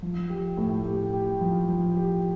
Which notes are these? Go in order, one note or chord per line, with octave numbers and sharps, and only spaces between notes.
F3
G4
A2
G4
G4
F3
F3
G4